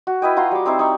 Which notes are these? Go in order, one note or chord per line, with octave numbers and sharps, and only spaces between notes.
F#4
E4 B4 D#5 G5
F4 F#4 A#5 C6
G3 D6
C4 D#4 E4 C5
D#4 D5 G5 C#6